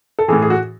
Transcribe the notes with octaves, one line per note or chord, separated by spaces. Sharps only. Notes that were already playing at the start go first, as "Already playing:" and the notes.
A4
A2 E3 G#4
G#4
F#4